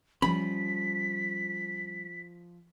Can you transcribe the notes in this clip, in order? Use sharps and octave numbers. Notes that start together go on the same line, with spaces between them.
F3 G3 A3 C#4 B5 B6